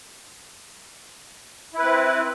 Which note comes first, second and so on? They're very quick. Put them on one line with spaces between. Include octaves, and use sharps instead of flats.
E4 B4 C4